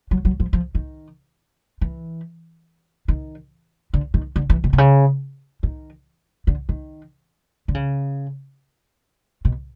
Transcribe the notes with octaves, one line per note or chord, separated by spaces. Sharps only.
F#3
F#3
F3
F3
D#3
E3
D#3
D3
D#3
D3
E3
B2
C3
C#3
D#3
D3
D#3
D3
C#3
B2